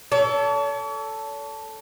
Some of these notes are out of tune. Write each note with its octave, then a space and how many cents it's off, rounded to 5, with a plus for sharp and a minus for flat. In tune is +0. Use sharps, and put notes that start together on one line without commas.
A4 +0 C#5 +45